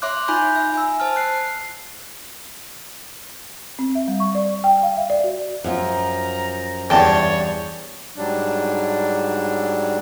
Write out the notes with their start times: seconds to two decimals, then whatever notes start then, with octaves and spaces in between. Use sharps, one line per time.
0.02 C#5 E5 C6 D6 F#6
0.28 D#4 F4 G#5 B5 F#6 G6
0.56 E5
0.74 G#5 E6
1.00 C5 A5 F6
1.16 F#6 C7
3.79 C4
3.95 E5
4.08 G3
4.20 C#6
4.35 D5
4.64 G5
4.83 F5
4.97 E5
5.10 D5
5.24 F#4
5.64 F#2 F3 F4 A#5
6.90 E2 G2 C#5 G5 A5
8.16 G#2 F#3 G3 D4